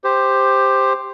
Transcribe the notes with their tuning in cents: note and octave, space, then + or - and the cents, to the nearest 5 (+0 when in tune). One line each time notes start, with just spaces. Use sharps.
G4 +10 C5 +0